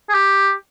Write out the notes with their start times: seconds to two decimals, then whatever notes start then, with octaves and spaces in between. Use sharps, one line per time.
0.09 G#4
0.14 G4